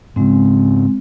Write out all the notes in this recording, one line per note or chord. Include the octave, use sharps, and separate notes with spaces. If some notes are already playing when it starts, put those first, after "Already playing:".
G#2 C#3 G#3 C4